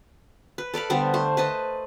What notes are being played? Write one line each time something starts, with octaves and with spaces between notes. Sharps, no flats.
B4
A4 D5 F5 B5
D3 G3 B3 C5
A3 C5
B4 C5 D#5 A5